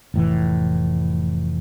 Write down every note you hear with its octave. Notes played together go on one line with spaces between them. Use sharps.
F1 A2 E3